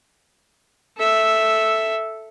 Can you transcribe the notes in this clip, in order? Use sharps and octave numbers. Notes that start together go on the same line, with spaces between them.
A4 E5